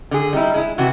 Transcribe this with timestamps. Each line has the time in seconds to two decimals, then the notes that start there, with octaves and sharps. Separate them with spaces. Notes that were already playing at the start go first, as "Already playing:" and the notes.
0.11 D3 G#4
0.33 G3 D#4 E4
0.54 G#3 E4
0.78 C3 E3 F#4